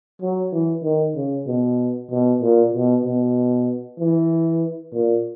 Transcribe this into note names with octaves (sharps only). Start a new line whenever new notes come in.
F#3
E3
D#3
C#3
B2
B2
A#2
B2
B2
E3
A#2